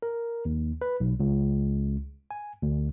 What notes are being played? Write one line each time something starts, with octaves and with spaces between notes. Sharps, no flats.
A#4
D#2
B4
B1
C#2
G#5
D2